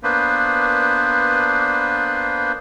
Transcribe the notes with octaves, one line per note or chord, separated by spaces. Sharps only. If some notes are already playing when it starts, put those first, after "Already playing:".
A#3 B3 D4 B4 C5